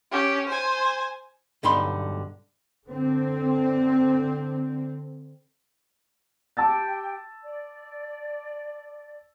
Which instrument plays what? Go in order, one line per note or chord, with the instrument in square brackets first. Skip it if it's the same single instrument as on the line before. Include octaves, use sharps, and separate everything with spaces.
[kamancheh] C#4 G4
C5 G#5
[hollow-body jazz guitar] B1 G2 D3 D#4 B5 C6
[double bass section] D3 C4
[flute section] G4 G5 [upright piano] A5 E6 A6
[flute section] D5